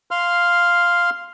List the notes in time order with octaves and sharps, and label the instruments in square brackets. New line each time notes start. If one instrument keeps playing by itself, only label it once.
[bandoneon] F5 C6 F6